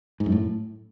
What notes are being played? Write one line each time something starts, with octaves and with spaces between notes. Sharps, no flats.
G#2
F#2
A2